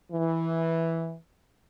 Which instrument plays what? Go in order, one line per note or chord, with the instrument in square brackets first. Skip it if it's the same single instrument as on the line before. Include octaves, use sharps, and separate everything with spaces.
[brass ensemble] E3